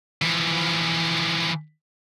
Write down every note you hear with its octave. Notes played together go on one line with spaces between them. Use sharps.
E3 F3